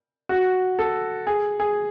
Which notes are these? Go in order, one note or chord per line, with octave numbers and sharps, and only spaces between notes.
F#4
A4
G#4
G#4